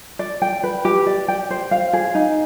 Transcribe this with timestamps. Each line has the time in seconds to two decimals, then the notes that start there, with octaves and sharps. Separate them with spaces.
0.19 D5
0.42 G5
0.63 B4
0.85 G4
1.06 D5
1.28 G5
1.51 C5
1.71 F5
1.93 G#4
2.15 D#4